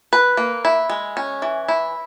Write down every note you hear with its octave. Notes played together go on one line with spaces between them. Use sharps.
B4
A#3
E4
G#3
C#4
E3
E4